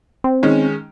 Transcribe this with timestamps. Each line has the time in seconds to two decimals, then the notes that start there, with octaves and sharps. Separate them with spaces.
0.24 C4
0.43 D#3 G#3 C#4